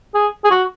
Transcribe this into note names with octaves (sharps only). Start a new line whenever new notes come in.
G#4
G#4
F#4